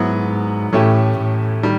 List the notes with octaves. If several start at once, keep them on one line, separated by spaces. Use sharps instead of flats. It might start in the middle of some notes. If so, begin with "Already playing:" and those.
Already playing: G#2 F#3 B3 E4
A2 E3 A3 C#4 E4 G4
A2
D#3 G3